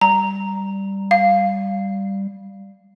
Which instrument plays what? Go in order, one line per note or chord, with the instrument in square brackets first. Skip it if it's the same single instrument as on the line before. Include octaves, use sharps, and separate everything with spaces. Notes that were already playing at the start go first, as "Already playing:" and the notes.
[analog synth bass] G3 [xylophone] A#5
[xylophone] F5